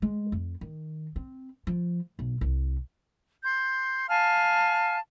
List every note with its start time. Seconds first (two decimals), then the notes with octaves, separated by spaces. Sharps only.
0.02 G#3
0.32 F2
0.61 D#3
1.16 C4
1.67 F3
2.19 B1
2.41 C2
3.43 C6 G6
4.08 F5 G#5 A5 F6